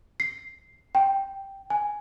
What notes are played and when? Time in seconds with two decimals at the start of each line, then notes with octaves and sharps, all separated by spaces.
0.20 C7
0.95 G5
1.70 G#5